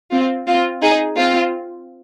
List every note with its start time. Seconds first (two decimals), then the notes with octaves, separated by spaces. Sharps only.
0.12 C4 F4
0.47 C4 F4
0.82 D#4 G#4
1.17 C4 F4